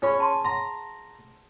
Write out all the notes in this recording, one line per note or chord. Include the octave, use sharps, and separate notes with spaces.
C#4 G#4 B5
D#5 A5 C6
F#5 A#5 C6